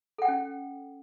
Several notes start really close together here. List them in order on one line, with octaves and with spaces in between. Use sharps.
A4 F#5 G5 C#4